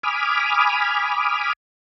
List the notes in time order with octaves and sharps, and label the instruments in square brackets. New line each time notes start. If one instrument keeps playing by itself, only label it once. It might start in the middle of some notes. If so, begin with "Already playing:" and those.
[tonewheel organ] G#5 B5 D6 D#6 F6